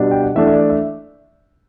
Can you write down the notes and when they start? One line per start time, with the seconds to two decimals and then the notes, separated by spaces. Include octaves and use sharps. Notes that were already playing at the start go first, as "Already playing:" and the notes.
Already playing: B2 G3 D4
0.11 G5
0.24 F#5
0.35 E3 A3 D4 E5
0.47 E5
0.53 D5
0.70 E5